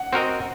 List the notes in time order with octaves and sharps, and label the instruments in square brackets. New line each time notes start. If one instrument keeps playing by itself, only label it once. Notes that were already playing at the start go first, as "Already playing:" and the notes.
Already playing: [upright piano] F#5
[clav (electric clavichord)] C4 F#4 A#4 D#5